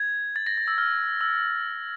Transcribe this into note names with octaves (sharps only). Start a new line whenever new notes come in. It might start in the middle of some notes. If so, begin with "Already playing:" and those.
Already playing: G#6
A6
A#6
A6
E6
F6
E6